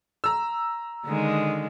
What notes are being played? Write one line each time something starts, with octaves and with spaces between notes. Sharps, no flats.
A#5 E6
D3 D#3 G#3